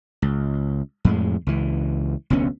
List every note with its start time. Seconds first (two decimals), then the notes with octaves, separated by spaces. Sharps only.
0.22 C#2
1.05 F2 A2 G#3
1.47 C#2 E3
2.30 F1 D2 B3 C#4